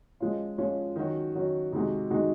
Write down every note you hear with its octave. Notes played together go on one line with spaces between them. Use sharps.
F3 G#3 C#4 F4
F3 G#3 C#4 F4
D#3 F#3 C#4 F#4
D#3 F#3 C#4 F#4
C3 D#3 G#3 D#4 F#4
C3 D#3 G#3 D#4 F#4